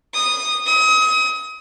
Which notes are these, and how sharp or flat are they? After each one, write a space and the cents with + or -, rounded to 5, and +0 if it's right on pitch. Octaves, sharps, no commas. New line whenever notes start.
D#6 -10
D#6 +35